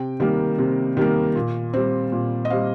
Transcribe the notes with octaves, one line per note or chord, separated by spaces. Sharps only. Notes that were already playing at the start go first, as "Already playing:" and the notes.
Already playing: C3 G5
D#3 G3 A#3
C3
D#3 G3 A#3
A#2
G3 C4
A#2
D#5
G3 C4 F5